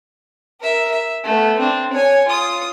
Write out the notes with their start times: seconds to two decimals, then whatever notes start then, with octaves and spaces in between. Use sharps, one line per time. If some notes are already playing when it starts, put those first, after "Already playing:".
0.61 A#4 E5
0.92 E5
1.24 A3 B3
1.59 C4 D4
1.93 C#5 G#5
2.28 F4 D#6